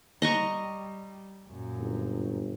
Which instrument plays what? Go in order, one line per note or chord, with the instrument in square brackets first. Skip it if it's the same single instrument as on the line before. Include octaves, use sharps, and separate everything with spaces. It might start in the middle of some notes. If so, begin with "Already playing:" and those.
[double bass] G3 [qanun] D#5 A#5 C#6
[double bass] F#2 A#2
[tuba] G1